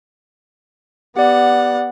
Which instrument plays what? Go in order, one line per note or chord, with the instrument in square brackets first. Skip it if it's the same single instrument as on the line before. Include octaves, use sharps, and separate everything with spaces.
[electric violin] B3 F#5 [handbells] G4 D5